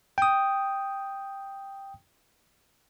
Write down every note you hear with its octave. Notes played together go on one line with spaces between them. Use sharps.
G5 D#6